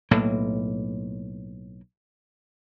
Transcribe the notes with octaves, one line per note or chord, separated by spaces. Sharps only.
B1 A2 A#3